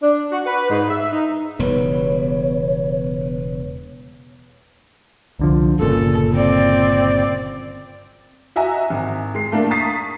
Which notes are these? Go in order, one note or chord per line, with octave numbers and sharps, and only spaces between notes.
D4
F#4
B4
G#2
E5
D#4
E1 C#3 G3 B3 B4 C#5
C2 D3 F3
G1 A#2 C#3 A4
C4 D5
F#4 D#5 E5 G#5 A#5
G#1
G#3 C7
A3 A#3 D4
A#5 C#6 D#6 A6 B6 C7